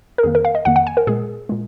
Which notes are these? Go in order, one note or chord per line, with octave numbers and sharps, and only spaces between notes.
A#4
F2 D#3 A#3 G#4
A#4
F5
D#5
F2 D#3 A#3 F#5
F#5
G#5
A#4
A#2 G#3 G#4
A#2 G#3